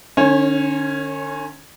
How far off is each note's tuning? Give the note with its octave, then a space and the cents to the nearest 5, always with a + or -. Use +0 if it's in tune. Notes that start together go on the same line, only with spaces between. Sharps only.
D3 +45 C#4 +0 C#5 -30